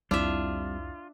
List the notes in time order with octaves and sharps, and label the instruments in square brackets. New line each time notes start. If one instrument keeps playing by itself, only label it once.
[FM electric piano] C2 F2 E4 [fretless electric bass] G3 C4 [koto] D4 E5 [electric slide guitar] F4